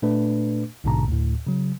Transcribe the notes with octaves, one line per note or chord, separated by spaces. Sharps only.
A#2 A3 D4 B4
A#1 G#2 B2 D3 A5 A#5
D2 A2
C#3 F#3